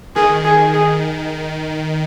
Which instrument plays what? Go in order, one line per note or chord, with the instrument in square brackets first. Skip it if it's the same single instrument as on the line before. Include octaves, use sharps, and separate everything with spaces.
[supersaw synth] D#3 [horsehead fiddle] G#4
[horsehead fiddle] G#4
G#4